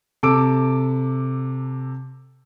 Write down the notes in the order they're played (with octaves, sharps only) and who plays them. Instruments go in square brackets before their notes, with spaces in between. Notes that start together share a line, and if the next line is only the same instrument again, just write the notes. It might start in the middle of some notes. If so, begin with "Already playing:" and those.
[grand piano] C3 A4 D6 E6 D7